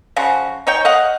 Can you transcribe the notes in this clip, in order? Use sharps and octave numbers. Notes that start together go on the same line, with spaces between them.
C#3 F3 F#4
D#4 C#5 G5
D#5 F5 F#5